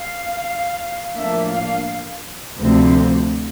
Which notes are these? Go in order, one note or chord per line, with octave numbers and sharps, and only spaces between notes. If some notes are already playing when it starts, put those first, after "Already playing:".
Already playing: F5
A2 F3 A#3 D4 E5
F5
D2 C3 F3 C4